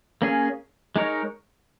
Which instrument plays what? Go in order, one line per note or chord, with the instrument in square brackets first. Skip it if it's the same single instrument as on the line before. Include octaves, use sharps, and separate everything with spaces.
[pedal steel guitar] A#3 C#4 G#4
G#3 D#4 A#4 C#5